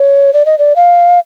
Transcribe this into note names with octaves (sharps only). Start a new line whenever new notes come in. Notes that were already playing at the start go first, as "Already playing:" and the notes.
Already playing: C#5
D5
D#5
D5
F5